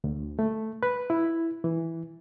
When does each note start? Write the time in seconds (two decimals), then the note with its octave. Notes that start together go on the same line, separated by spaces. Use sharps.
0.04 D2
0.39 A3
0.83 B4
1.10 E4
1.64 E3